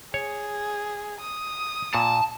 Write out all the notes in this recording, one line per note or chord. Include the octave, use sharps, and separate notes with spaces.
G#4 C#5
D#6
A#2 A5